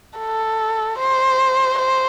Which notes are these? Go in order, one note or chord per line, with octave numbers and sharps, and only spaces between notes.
A4
C5
C5